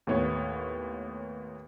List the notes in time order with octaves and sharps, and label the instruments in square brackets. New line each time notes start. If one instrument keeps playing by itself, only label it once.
[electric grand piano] D#2 A2 B3 C#5